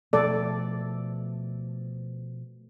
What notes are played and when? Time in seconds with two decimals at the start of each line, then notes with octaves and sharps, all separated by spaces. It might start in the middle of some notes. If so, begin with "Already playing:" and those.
0.13 B2 F3 A3 A4 D5